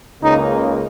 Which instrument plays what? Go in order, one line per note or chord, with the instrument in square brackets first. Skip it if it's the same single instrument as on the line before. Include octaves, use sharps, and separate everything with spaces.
[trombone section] C#2 C#3 A#3 D#4